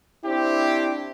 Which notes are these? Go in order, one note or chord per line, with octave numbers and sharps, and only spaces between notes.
C4 D4 E4 G4